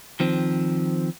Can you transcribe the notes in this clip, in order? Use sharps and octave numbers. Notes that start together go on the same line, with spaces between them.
D#3 F3 C4